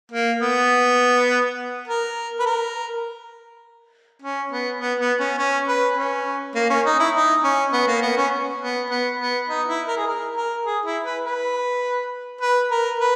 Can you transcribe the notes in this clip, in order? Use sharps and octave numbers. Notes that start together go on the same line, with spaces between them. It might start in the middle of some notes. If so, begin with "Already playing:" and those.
A#3
B3
A#4
B4
A#4
C#4
B3
B3
B3
C#4
C#4
B4
C#4
A#3
C#4
D#4
E4
D#4
C#4
B3
A#3
B3
C#4
B3
B3
B3
D#4
E4
A#4
G#4
A#4
A#4
G#4
E4
B4
B4
B4
A#4
B4